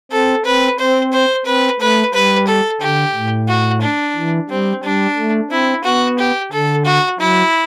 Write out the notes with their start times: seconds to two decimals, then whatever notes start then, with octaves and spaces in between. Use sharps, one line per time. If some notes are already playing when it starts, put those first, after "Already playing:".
0.11 C4 A4
0.45 C4 B4
0.78 C4 C5
1.12 C5
1.45 C4 B4
1.80 A3 B4
2.13 G3 B4
2.47 A4
2.81 D3 G4
3.14 A2
3.48 F#4
3.81 D4
4.15 E3
4.49 G3 C4
4.83 G3 D4
5.17 A3
5.50 C4 E4
5.84 B3 F#4
6.18 G4
6.51 D3 A4
6.85 F#4
7.19 F#3 E4